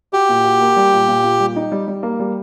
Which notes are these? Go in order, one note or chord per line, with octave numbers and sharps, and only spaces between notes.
F#4 G4
A#2
F#4
A#3
G3
A#2
A#2
A#2
G3
D#4
G3
G3
A#3
G3